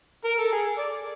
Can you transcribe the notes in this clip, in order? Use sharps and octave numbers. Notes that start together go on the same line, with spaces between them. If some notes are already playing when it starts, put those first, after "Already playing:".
A#4
A4
G#4
D5